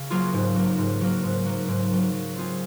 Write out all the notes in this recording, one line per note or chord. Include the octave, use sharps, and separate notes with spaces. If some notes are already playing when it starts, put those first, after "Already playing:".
Already playing: C#3
F#3 A#3 F4 G#4
G#2
F#3 A#3
G#2
F#3 A#3
G#2
F#3 A#3
G#2
F#3 A#3
F#3
C4 F4 G#4